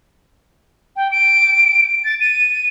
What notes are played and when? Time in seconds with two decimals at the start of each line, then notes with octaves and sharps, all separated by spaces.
0.96 G5
1.12 D7
2.05 A6
2.20 D#7